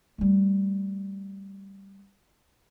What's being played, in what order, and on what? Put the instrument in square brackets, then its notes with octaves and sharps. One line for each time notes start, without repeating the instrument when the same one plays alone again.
[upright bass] G3 A3